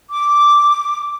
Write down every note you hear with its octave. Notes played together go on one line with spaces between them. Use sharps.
D6